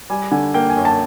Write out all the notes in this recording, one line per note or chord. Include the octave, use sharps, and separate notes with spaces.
G3 G#5
D3 G#5
A#3 G5
G#5
F#2
A5